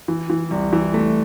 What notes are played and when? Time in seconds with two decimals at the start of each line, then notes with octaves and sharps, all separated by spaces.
0.08 E3
0.30 E3
0.51 C2
0.73 E3
0.94 A3